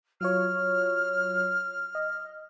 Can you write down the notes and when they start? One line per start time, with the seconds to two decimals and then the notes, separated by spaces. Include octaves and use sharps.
0.21 F#3 F4 C#5 F6
1.95 D#5